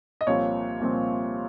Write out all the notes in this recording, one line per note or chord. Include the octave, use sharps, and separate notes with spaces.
D#5
C2 A#2 F3 C4 C#5
C2 A#2 F3 C4